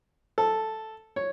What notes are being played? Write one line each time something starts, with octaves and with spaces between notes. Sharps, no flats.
A4
C#5